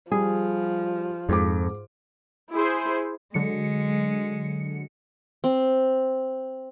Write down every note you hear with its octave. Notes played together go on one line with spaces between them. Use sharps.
F3 G3 G#4
F2 G#2 D6
E4 G#4 C5
D3 F#3 G#3 C#7
C4